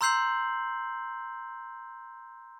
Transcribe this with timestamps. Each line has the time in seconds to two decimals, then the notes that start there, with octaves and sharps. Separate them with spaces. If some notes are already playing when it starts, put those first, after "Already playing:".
0.01 A#5 C6 E6 G6 C7 F#7